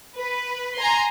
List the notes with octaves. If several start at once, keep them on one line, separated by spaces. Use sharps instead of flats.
B4
G#5 A#5 C6